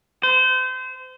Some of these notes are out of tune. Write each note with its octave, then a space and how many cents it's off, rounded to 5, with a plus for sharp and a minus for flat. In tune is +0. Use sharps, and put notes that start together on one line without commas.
C5 -30